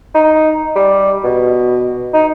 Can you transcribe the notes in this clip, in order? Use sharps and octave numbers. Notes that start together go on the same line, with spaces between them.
D#4
G3
B2
D#4